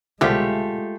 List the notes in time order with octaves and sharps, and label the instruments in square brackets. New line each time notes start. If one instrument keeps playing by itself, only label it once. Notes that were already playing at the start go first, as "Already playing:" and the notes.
[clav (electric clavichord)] C2 B2 D3 [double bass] G#3 [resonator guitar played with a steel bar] A3 F4 G4